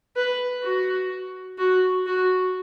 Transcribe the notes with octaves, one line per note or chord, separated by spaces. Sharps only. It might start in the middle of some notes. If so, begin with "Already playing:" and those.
B4
F#4
F#4
F#4